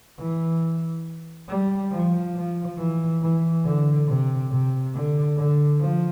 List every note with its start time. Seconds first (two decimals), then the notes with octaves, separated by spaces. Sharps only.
0.19 E3
1.49 G3
1.92 F3
2.36 F3
2.78 E3
3.22 E3
3.65 D3
4.08 C3
4.51 C3
4.95 D3
5.38 D3
5.80 F3